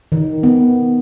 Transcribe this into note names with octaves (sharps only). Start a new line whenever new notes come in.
D#3
B3